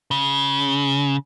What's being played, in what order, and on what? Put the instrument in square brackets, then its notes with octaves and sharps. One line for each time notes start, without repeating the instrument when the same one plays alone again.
[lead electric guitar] C#3